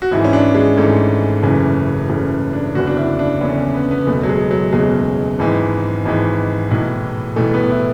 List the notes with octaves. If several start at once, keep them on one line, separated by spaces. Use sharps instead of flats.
F#4
G#1 G#2 E3 E4
C#4
D4
G#3
G#1 G#2 E3 A3
F#1 F#2 C#3 E3
F#1 F#2 C#3 E3 A3
D4
F#1 E2 D3 F#4
D4
E4
D4
F#1 E2 D3 C#4
C#4
B3
B3
F#1 E2 B2 A3
F#3
G#3
F#3
F#1 E2 B2 G#3
G#1 G#2 E3
G#1 G#2 E3
B1 A2 E3
B1 A2 E3 A3
B3
E4